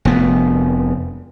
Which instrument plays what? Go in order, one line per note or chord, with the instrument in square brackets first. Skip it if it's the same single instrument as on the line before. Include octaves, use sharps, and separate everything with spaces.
[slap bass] F1 B3